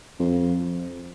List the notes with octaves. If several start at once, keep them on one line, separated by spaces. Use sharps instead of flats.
F2